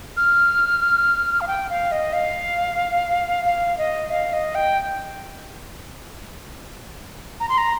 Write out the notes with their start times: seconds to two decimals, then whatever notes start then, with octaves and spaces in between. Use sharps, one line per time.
0.17 F6
1.41 F5
1.48 G5
1.70 F5
1.92 D#5
2.13 F5
3.45 F5
3.78 D#5
4.11 F5
4.33 D#5
4.55 G5
7.40 A#5
7.49 C6
7.58 A#5